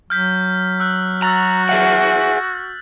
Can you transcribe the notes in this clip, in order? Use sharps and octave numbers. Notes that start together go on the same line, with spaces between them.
F#3 F6 G6 B6
E6 F#6
F#4 A#5 E6 A6 F#7
G#4 E5 F#5